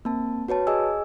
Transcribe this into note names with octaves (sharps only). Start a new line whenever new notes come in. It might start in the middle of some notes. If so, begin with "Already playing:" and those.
A#3 C4 A5
F#4 B4 C#5 A5
G#4 D#5 G#5 E6